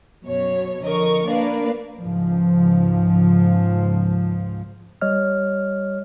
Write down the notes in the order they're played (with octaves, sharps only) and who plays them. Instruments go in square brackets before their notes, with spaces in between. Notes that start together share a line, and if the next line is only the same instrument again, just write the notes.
[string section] F#2 B2 C#5
F2 D3 A#4 D#5 C#6
A#3 D4 A#4 B4 D5 F5
[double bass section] C#2 G#2 F3
[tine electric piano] G3 C#5 D#5 F6